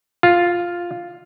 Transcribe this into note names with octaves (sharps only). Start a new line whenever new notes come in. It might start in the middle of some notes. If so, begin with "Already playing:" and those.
F4